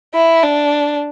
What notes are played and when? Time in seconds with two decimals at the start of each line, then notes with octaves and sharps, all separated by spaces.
0.14 E4
0.43 D4